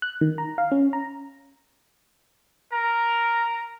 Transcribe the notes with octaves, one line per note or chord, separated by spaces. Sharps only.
F#6
D#3
A#5
F5
C#4
A#5
A#4 A#5